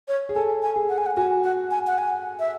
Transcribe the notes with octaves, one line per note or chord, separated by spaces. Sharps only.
C#5
G#4
A4 G#5
G#5
G#4
F#5
G#5
F#5
F#4 G#5
F#5
G#5
F#5
G#5
E5